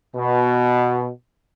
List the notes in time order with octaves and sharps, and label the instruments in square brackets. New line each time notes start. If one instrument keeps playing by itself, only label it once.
[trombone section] B2